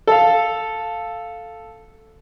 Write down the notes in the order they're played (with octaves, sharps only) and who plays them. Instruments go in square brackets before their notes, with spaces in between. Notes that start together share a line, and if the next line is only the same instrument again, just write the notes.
[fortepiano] A4 F5